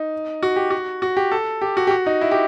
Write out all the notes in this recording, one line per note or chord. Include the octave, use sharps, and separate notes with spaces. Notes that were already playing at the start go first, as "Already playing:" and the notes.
Already playing: D#4
F#4
G4
F#4
F#4
G4
A4
G4
F#4
G4
F#4
D#4
E4
G4